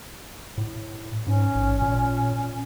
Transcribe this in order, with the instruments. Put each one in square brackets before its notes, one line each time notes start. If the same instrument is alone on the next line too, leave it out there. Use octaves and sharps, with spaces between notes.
[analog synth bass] A2
[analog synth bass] G#2 [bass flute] C#4
[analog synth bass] A1
A#2